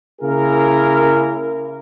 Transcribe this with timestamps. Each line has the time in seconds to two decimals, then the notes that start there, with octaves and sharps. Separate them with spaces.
0.21 C#3 A#3 E4 G#4 A#4